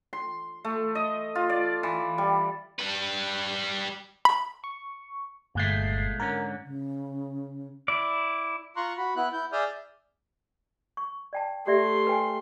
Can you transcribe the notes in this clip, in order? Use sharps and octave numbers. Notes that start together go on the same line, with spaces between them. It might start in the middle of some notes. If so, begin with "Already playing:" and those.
C6
A3
D#5
F4
D5
E3
G3
G3 B4
B5
C#6
G1 A#2 G#3 A3 G6 C7
G#2 D3 C#4 A#4
C#3
E4 D5
F4 A#5 C6 C#6 F#6
F#4 B5
B3 E4 F#6
E4 G6
G#4 D5 E5 D#6 F6 G6
C#6
D5 G5 A5
A3 G4 D5 E5 C6
B4 G5 G#5